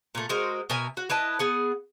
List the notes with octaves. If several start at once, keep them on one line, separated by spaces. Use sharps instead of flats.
A#2 A3
G#3 F#4 A#4 C5
B2 A#4 E5 G#5
F#4
E4 B4 D#5 A5
B3 G#4 F#5